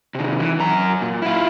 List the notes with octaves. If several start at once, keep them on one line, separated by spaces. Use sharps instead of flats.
C3 D#3
E3
F#2 A#5
A#2
E4 F4